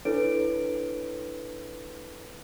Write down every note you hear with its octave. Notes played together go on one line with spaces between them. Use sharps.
D4 E4 A4 B4 C#5 D7